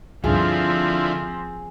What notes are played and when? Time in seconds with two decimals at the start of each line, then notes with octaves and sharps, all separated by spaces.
0.24 C#2 G2 D3 F3 C4 E4 F4 G#4